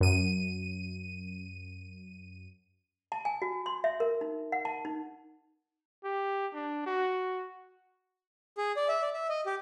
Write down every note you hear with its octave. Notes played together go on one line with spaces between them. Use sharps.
F#2 D#7
A5
G#5
F#4
C6
E5
A#4
D#4
F#5
A5
D#4
G4
D4
F#4
G#4
D5
E5
D5
E5
D#5
G4